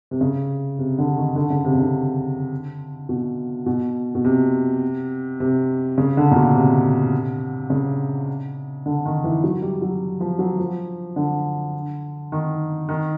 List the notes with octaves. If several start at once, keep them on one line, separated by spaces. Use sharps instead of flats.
C3
C#3
C3
D3
D#3
D3
C#3
C3
C#3
D3
B2
B2
B2
C3
C3
C#3
D3
A#2
B2
C3
C#3
D3
D#3
E3
F#3
G3
F#3
F3
F#3
F3
D3
D#3
D#3